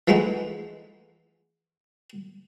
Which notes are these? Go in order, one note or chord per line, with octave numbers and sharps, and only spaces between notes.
E3 F3 G#3 A3 B3 D#4